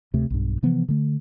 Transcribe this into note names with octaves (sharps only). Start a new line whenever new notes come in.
D2 C3 A3
B1 G2
C3 E3 F3 B3
D3 A3